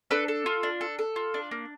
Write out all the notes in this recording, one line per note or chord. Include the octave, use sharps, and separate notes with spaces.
D4 A4 B4
A4
F4
D4
A4
A4
F4
D4
A#3